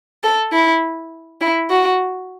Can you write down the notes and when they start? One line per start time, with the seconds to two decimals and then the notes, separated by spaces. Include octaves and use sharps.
0.24 A4
0.53 E4
1.41 E4
1.70 F#4